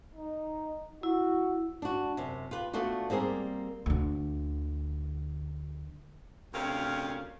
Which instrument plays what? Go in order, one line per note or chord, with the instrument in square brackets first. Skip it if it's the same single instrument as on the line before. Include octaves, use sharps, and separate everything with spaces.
[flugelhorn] D#4
[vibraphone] E4 [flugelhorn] F#4
[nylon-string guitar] D4 F#4
F#2 C3
F4 G4 B4
A3 B3 D4 F4 F#4
G3 A#3 C4 G#4 A#4
[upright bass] D2 D3
[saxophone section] D2 C3 C#4 A#4 F5